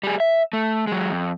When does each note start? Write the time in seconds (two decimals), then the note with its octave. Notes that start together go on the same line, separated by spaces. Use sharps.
0.03 G3 G#4
0.20 E5
0.53 A3
0.87 F#3 G#3
1.11 F2